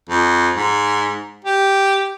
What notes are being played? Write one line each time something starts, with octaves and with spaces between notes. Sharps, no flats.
F2
G#2
G4